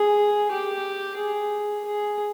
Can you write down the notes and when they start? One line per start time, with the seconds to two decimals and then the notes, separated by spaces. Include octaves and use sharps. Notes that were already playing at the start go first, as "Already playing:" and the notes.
Already playing: G#4
0.51 G4
1.18 G#4
1.85 G#4